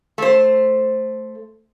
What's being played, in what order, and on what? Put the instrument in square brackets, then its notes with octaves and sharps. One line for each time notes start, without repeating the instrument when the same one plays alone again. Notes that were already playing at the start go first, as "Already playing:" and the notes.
[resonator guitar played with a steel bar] A3 C5